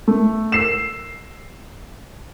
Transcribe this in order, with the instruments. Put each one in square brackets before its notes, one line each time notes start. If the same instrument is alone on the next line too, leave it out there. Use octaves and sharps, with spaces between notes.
[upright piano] A3
E6 C7 E7